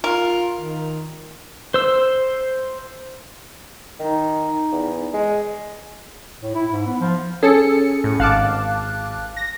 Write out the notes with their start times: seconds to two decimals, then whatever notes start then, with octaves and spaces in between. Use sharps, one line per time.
0.04 F4 A#4
0.56 D#3
1.74 C5 E6
4.00 D#3 D#4
4.72 E2
5.14 G#3
6.42 A2
6.55 E4
6.72 G#2
6.87 B3
7.01 F3
7.43 C#4 G#4 A4 G#5 C#7
8.04 A2
8.20 G#1 F5 A5 D6 F#6
9.37 A#6